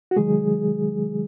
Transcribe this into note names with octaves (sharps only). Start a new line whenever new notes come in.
F#4
C3 D#3 F#3 G#3 G#4